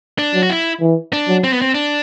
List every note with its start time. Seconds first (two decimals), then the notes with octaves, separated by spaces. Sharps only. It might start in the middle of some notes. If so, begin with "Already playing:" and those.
0.18 D4
0.35 F#3
0.43 F#4
0.50 E4
0.81 E3
1.13 D4
1.28 F#3
1.44 C4
1.53 B3
1.61 C4
1.74 D4